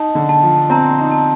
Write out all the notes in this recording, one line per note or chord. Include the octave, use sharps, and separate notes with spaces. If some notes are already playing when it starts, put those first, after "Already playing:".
Already playing: D#4 A5
D3
A5
F3
C4 A#5
D#4
A5